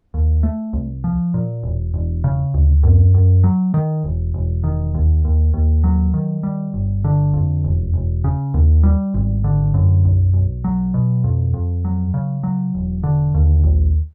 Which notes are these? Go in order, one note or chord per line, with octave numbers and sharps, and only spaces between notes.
D#2
A3
C2
F3
A#2
E1
E1
C#3
D2
F#2
F#2
F#3
D#3
E1
E1
D#3
D#2
D#2
D#2
F#3
D#3
G3
G1
D3
F2
E1
E1
C#3
D#2
G3
G#1
D3
F#2
B1
B1
F#3
B2
F2
F2
F#3
C#3
F#3
E1
D3
D#2
A#1